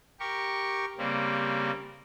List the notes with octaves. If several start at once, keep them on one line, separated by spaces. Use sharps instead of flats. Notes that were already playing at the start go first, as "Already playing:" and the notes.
G4 A#4 C#6
C#3 G3 A#3 C4